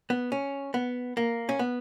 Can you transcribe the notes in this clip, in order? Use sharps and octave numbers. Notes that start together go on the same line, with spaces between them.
B3
C#4
B3
A#3
C#4
B3